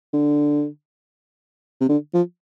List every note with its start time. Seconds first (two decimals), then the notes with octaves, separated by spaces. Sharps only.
0.13 D3
1.81 C3
1.89 D3
2.14 F3